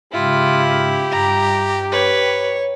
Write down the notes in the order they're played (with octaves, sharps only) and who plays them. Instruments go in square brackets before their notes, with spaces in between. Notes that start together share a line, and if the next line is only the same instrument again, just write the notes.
[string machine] G#2 C#3 [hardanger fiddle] E4 [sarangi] F4 [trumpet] G4
[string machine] G2 D6 [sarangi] A#5
[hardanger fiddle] B4 [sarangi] C#5